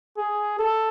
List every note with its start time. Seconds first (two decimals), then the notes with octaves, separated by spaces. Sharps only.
0.18 G#4
0.59 A4